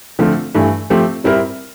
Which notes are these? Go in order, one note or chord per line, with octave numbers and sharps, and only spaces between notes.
D3 F3 A3 C4 F4
G2 E3 A3
F3 A3 C4 G4
G3 C4 E4 A#4